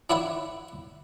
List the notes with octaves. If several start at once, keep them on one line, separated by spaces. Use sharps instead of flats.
D4 E4 C#5 F#5 B5